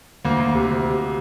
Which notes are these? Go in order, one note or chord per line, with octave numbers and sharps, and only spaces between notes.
D2 A#3
D2
C3
D2
C3